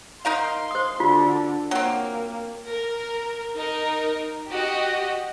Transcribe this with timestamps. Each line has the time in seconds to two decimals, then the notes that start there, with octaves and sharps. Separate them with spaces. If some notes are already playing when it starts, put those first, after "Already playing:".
0.25 D#4 A#4 F5 C6
0.71 C5 D#6
1.00 D3 F4 F#4
1.71 F#3 A#3 C4
2.68 A#4
3.57 D#4 A#4
4.49 F#4 G4 D#5